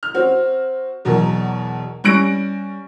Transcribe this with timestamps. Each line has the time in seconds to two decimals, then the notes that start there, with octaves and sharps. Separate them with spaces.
0.03 F6
0.14 C4 F#4
1.05 E2 B2 F#3 A#4
2.04 G3 C#4 C#6 F#6 A#6 D7